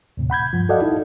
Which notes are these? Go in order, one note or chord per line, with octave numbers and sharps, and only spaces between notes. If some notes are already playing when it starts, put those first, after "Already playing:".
D#2 A2 C3
F#5 B5 G6 G#6
G2 F3
F#4 A4 D5 D#5 F5 F#5
D#4 E4 A4